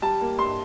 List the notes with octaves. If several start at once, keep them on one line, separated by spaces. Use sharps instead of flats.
G3 A5
A#3
G2 C6